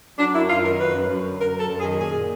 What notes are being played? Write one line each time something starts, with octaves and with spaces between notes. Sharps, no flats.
F#3 D4
F#2 E4
F#2 F4
D#3 A#4
F#3 B4
F#2
F#2
D3
F#3 A#4
F#2
A4
F#2
G#4
D#3
A#2 G#4
A#2